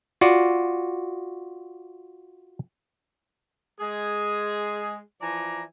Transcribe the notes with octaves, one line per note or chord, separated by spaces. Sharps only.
F4 F#4 D5
G#3 G#4
E3 F3 D5 G#5 A#5